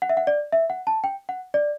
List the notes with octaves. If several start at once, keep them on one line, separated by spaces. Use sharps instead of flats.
F#5
E5
F#5
D5
E5
F#5
A5
G5
F#5
D5